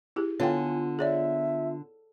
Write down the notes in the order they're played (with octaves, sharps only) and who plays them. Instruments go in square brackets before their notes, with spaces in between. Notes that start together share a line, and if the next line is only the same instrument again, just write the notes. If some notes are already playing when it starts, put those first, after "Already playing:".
[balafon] E4 G4 G#4
[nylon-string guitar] D3 [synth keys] B3 F4 [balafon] C#5 F5 G5 [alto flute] G#5
[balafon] G#4 C#5 D5 [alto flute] E5